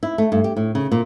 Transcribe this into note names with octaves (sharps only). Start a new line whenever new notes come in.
E4
A3
G2
G4
A2
C#3
A#2